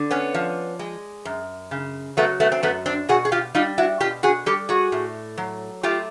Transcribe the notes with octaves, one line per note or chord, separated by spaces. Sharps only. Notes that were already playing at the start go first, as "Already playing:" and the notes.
Already playing: D3
B3 C#4
F3
G#3
F#2
C#3
F#3 A3 B3
A3 B3
C4
F#2 A3 B3
C4 D4
B2 F#4 G#4
G#4
F4 G4
G3 D#4 F4
E4 F#4
B2 F4 G4
F#4 G#4
G3 G4 A4
F#4 G#4
A2
F#3
A3 F4 G4